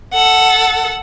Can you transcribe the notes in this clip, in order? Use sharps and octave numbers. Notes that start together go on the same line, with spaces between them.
A4 F#5